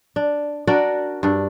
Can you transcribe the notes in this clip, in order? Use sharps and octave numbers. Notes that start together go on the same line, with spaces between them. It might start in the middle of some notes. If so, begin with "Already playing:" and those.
D4
D4 F#4 A#4 D5
G2 D4